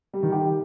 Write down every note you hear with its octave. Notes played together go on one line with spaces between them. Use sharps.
G3
D#3
G4